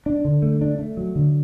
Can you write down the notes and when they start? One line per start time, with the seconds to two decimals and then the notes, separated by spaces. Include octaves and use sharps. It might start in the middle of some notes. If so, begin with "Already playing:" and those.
0.06 D4
0.25 D3
0.42 A3
0.61 D4
0.79 A3
0.97 F#3
1.16 D3